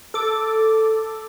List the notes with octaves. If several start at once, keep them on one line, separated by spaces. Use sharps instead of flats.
A4 D6